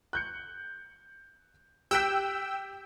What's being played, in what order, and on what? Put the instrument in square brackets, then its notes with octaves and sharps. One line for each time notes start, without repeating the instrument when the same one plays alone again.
[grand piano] F#6 G6 C#7
[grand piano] G4 F#6 B6 [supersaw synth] G5 E6